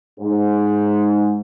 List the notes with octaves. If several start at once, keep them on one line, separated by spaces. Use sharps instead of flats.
G#2